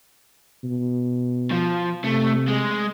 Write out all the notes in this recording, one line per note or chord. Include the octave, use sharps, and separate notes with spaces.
B2
F3
C3 A3
G#3